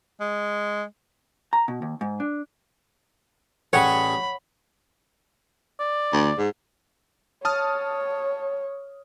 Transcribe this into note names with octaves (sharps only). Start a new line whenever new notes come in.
G#3
A#5
B2
D#2
G#2
D4
A1 G3 G#4 C#5 F#5 B5
D5
D2
G#2
C#5 A5 D#6 F6